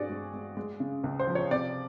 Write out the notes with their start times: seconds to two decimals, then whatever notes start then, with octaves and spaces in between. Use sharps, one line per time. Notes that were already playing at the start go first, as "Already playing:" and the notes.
Already playing: G2 C4 F#4 G#4 D5
0.09 G#3
0.33 G#3
0.57 G#3
0.80 C#3
1.04 C#2
1.19 C5
1.27 F3
1.35 C#5
1.51 C3 D5